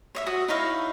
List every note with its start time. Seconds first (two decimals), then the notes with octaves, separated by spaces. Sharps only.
0.15 C#5 D#5 E5
0.26 F#4 D#6
0.48 D#4 E4 C#5 F5